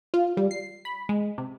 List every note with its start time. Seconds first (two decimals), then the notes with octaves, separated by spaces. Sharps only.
0.14 F4
0.37 G3
0.51 C7
0.85 B5
1.09 G#3
1.38 C3